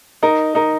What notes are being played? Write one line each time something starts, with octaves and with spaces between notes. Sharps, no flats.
D#4 A#4
D#4 A#4